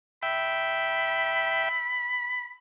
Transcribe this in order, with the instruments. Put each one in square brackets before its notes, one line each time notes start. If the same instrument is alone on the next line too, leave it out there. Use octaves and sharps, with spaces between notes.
[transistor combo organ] E5 G5 [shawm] B5